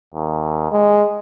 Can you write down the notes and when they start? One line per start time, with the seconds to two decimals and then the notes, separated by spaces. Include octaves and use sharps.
0.14 D#2
0.72 G#3